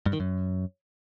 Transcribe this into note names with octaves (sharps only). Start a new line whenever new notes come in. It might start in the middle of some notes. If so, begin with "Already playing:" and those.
G2
D#3
F#2